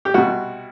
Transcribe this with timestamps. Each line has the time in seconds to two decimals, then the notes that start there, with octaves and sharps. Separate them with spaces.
0.05 G4
0.14 C2 B2 F#4